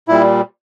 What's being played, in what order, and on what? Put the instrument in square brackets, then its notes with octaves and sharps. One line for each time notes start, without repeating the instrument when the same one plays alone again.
[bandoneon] A#2 G3 E4